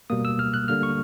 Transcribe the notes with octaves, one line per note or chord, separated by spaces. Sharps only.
B2 G3 A#3 D#6
E6
F6
F#6
D3 G3 A#3 F6
C#6